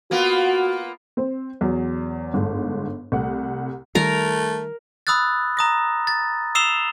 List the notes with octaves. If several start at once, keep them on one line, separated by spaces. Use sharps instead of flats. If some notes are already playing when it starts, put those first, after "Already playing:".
A#3 B3 F4 F#4
C4 C5
E2 F#3
G1 G#2 A4
C2 A3 F#5
D#3 G3 A3 A#4
B5 D#6 E6 F#6 A6
A#5 D#6 A#6
A6
D#6 E6 C7 E7 F7 G7